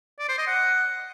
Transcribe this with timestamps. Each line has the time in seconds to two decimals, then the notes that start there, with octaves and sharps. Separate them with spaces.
0.19 D5
0.29 C5
0.38 D#5
0.47 F#5